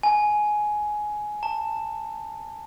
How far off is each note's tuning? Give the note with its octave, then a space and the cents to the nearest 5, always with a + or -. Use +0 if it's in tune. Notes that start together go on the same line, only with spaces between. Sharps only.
G#5 +15
A5 +25